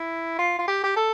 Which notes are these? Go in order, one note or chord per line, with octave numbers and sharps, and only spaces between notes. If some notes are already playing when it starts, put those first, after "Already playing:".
Already playing: E4
F4
F4
G4
G4
A4